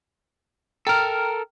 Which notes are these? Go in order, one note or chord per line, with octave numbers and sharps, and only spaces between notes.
A4 A#4 G5 A#5 F6